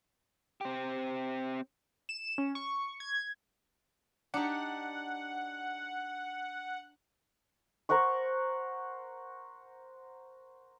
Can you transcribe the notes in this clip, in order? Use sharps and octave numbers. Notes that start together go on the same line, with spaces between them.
C4 G4
E7
C#4
C#6
G#6
D4 D#4 G4 F#5
A#4 C5 F#5 C#6